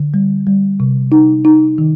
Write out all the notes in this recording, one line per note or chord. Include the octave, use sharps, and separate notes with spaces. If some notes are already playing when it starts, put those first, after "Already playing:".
Already playing: D3
G3
G3
C3
D#4
D#4
D#3